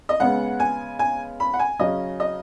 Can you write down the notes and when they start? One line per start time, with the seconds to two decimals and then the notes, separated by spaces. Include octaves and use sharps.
0.09 D#5
0.20 C#3 G#3 B3 F#5
0.60 G#5
0.99 G#5
1.40 B5
1.54 F#5
1.59 G#5
1.79 C#3 F#3 C#4 D#5
2.20 D#5